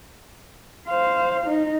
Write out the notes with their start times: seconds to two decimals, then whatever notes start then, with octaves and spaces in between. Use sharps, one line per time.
0.88 C5 F5
1.46 D#4